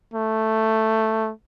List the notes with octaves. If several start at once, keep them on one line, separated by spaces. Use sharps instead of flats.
A3